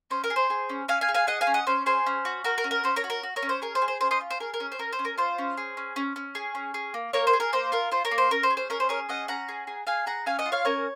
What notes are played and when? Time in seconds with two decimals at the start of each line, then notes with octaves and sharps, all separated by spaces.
0.11 C#4 C5
0.24 A#4
0.30 G#4
0.36 C5
0.50 G#4
0.69 C#4
0.88 C#4 F5 G#5
1.01 F5 G#5
1.09 G#4
1.14 F5 G#5
1.27 G#4 D#5 F#5
1.41 F5 G#5
1.47 C#4
1.54 D#5 F#5
1.67 C#4 C5
1.86 G#4 C5
2.06 C#4
2.25 F#4
2.44 F#4 A#4
2.58 A#4
2.64 C#4
2.71 A#4
2.84 C#4 C5
2.96 A#4 C#5
3.04 F#4
3.10 A#4
3.23 F#4
3.36 A#4 C#5
3.43 C#4
3.49 C5
3.62 G#4 A#4
3.75 C5
3.82 G#4
3.88 C5
4.01 C#4 C5
4.11 C5 D#5
4.21 F4
4.31 C5
4.40 G#4 A#4
4.54 A#4
4.60 C#4
4.72 C5
4.79 C#4 A#4
4.93 C5
4.99 C#4
5.05 A#4
5.18 F4 C5
5.38 C#4
5.57 G#4
5.77 C#4
5.96 C#4
6.16 C#4
6.35 G#4
6.55 C#4
6.74 G#4
6.94 A#3
7.13 A#3 A#4 C#5
7.27 C5
7.33 G#4
7.40 A#4
7.53 A#3 C5
7.72 F4 A#4
7.92 F4 C5
8.05 A#4 C#5
8.11 A#3
8.18 C5
8.31 C#4 A#4
8.43 C5
8.50 G#4
8.57 C5
8.70 C#4 A#4
8.80 C5
8.89 G#4 A#4 C#5
9.09 C#4 D#5 F#5
9.28 C#4 F#5 A#5
9.48 G#4
9.67 G#4
9.87 G#4 F5 G#5
10.06 G#4 F#5 A#5
10.26 C#4 F5 G#5
10.39 D#5 F#5
10.46 F4
10.52 C#5 F5
10.65 C#4 A#4 C#5